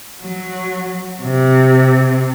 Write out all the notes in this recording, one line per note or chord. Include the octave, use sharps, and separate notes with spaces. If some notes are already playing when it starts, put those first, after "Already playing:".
F#3
C3